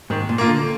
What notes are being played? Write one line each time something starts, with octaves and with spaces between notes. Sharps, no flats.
G#2 D#3
A#2
A#3 F4
D3